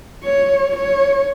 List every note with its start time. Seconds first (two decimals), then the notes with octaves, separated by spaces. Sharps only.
0.24 C#5
0.76 C#5